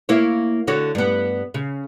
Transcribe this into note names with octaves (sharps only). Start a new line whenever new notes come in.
A#3 E4 C#5
D3 F#4 C#5
G2 B3
C#3